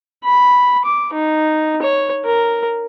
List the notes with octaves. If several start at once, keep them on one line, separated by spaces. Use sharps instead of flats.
B5
D6
D#4
C#5
A#4